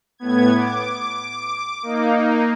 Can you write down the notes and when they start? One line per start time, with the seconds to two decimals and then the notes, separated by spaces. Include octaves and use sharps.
0.18 A2 B3 G#6
0.57 D6
1.83 A#3 D#4